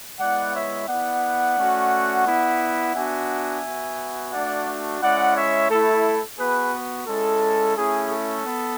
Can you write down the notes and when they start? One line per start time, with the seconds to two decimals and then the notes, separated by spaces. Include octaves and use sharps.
0.19 G#3 B3 E4 D5 F#5
0.53 C#5 E5
0.88 B3 E4 D5 F#5
1.57 A3 C#4 F#4
2.26 B3 E4
2.94 B3 D4 F#4 E5 G#5
3.63 B3 F#4
4.32 A3 D4 F#4 D5 F#5
5.01 G#3 C#4 E4 D5 F#5
5.36 C#5 E5
5.69 A3 E4 A4
6.39 B3 F#4 G#4 B4
7.07 G#3 C#4 E4 A4
7.76 A3 C#4 E4 G#4
8.11 A4
8.46 B3